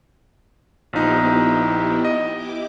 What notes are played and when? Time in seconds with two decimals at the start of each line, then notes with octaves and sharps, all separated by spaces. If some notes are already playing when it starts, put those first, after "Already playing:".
0.93 A#1 F3 B3 D#4 E4 G4
2.05 D#5
2.35 E4 G4 D6